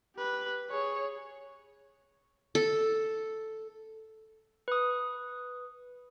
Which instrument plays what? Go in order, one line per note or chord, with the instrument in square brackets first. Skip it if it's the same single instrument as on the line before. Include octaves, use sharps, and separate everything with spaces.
[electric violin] G4 B4
[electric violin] G#4 [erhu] C#5
[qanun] A4
[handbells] B4 D#6